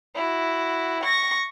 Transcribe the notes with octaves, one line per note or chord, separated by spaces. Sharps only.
E4 F#4
C#6 A#6